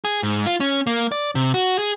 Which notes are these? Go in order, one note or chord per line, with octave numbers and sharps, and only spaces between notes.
G#4
G#2
F4
C#4
A#3
D5
C3
F#4
G#4